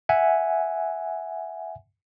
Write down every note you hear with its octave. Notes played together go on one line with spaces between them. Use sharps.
E5 F#5 G#5